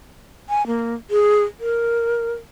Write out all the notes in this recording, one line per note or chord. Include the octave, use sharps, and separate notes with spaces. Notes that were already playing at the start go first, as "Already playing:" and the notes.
G#5
A#3
G#4
A#4